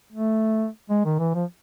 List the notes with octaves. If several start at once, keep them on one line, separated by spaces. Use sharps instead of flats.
A3
G#3
D#3
E3
F3